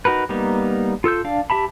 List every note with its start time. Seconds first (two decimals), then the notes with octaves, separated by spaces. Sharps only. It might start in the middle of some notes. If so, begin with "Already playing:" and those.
0.05 D#4 F#4 A#4 B4
0.29 G3 A#3 B3 D#4
1.04 F4 A4 E6 G6
1.25 D4 D5 F5
1.50 G4 E5 A5 B5